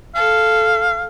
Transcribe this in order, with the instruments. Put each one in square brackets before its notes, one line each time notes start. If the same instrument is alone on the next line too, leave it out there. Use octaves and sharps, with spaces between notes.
[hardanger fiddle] A4 [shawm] F5